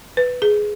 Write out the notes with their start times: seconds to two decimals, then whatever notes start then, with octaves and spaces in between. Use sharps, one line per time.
0.17 B4
0.42 G#4